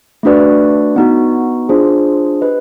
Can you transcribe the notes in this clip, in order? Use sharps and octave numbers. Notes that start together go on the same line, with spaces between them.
A3 D4 F#4 B4 D5
B3 D#4 F#4
D4 F4 G#4 C5
G4 B4 D#5